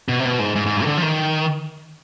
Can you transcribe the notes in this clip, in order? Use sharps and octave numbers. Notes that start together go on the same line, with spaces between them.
B2
C3
B2
G#2
G#2
G#2
G2
D#3
D3
F3
D#3